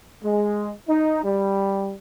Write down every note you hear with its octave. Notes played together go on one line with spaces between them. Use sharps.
G#3
D#4
G3